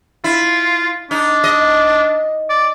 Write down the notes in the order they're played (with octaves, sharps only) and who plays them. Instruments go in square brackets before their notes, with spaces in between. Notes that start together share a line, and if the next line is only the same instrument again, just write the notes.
[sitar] E4 [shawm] F4
[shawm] D4 [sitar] D#4
[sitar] D#5
[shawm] D5